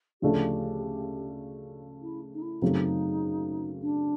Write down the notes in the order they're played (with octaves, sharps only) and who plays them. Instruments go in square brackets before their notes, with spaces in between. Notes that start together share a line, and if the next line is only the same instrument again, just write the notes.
[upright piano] D2 C#3 F3 A3 D4 [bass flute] G4
[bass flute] E4
D#4
E4
[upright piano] F#2 C#3 F#3 A3 C4 [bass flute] D#4
[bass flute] D4